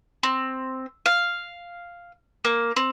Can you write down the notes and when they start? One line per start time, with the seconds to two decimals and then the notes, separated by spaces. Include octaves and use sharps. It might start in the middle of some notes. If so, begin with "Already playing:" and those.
0.23 C4
1.06 F5
2.45 A#3
2.76 C4